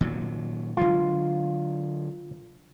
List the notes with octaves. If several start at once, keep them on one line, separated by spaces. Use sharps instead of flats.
A#2 D#3 F#3
D3 F#3 G#3 F4